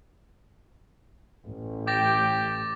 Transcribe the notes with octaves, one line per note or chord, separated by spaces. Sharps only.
A1
G4 G5 D6 A6 A#6